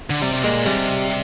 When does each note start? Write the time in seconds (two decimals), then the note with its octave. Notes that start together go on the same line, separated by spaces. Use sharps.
0.10 D3
0.22 C3 G3
0.33 G3
0.43 A#2 G#3
0.66 C3 G3